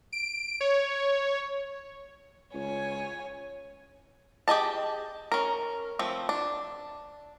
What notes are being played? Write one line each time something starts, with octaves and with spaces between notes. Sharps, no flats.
D7
C#5
C#2 C#5 G#5
G4 G#4 D#5 A5
C#4 A#4
F3 A3 C4
D4